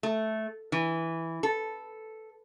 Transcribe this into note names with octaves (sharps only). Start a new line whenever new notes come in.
A3
E3
A4